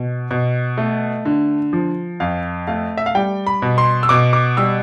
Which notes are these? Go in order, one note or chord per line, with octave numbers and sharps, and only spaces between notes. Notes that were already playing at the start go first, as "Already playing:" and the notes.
Already playing: B2
B2
A3
D3
F3
F2 F5
A3 F5
E5
F5
G3 G5
B5
B2
C6
E6
B2 D6
D6
G3 E6